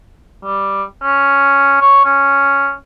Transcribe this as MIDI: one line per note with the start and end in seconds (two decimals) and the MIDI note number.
0.44 0.83 55
1.02 1.80 61
1.82 2.02 73
2.05 2.72 61